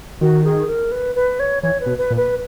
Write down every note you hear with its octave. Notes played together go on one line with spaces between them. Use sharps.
D#3 F#4
G#4
A#4
B4
B4
C#5
E3 C#5
B4
B2
B4
A#2
B4